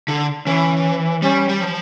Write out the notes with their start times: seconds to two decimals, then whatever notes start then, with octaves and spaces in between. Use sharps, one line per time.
0.08 D3
0.46 E3 C#4
1.22 G3 C#4
1.49 G3
1.61 F3